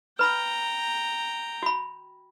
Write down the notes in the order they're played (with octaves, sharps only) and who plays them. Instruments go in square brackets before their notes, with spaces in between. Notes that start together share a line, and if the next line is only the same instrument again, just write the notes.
[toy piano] B4 B5 [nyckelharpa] G5 A#5
[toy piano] F#4 B5